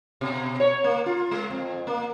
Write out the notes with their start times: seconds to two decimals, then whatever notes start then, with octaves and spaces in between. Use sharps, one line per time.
0.21 B2
0.60 C#5
0.84 A#3
1.06 F4
1.31 G#3
1.50 F2
1.87 A#3